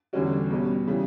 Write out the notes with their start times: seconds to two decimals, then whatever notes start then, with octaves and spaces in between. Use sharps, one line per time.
0.13 E2 D3 G3 C#4 F#4
0.50 B2 G3 C#4
0.87 C#3 E3 G3